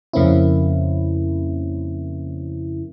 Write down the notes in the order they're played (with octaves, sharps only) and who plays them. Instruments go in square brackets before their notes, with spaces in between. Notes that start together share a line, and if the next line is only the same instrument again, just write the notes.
[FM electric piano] F2 C#3 A#3 C4 C#4 E4